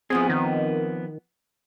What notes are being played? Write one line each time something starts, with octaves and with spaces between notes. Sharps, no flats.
F3 B3 C4 G#4
D#3